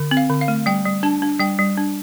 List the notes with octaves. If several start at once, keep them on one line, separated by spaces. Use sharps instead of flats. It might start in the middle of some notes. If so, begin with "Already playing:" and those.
Already playing: D3
C4
F5
D3
F5
A3
G3 G5
G3
D4 A5
D4
G3 G5
G3
D4